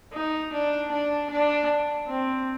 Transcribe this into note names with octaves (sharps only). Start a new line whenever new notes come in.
D#4
D4
D4
D4
C4